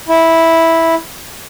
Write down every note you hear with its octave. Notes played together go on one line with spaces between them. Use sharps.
E4